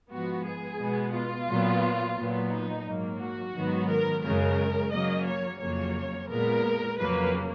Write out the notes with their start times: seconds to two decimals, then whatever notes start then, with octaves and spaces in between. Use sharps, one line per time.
0.10 G#2 F3 B3 F#4
0.44 G#4
0.78 B2 G#3 B3
1.13 F4
1.48 A#2 F#3 B3
2.16 A#2 F#3 B3
2.50 D#4
2.85 G#2 F#3 A#3
3.19 F#4
3.53 G#2 D#3 F#3 B3
3.88 A#4
4.22 F#2 C#3 G#3 A#4
4.91 C#3 F#3 A#3 D#5
5.26 C#5
5.60 F2 C#3 F#3 A#3 C#5
6.28 A#2 G#3 B3 A#4
6.97 F2 C#3 F#3 A#3 B4